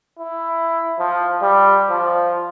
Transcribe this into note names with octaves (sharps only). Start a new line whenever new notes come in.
E4
F3
G3
F3